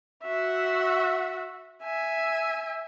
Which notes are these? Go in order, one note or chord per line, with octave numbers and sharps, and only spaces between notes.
F#4 E5
E5 G#5